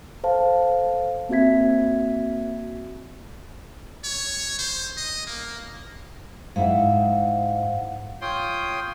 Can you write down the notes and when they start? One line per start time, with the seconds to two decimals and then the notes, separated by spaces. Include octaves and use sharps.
0.23 A4 C5 F5 A5
1.29 A#3 C4 F#4 E5 G#6 B6
4.04 C#5
4.59 C5
4.97 D#5
5.27 A#3
6.56 G#2 E4 F5 F#5
8.21 F4 C#5 G5 C6 D#6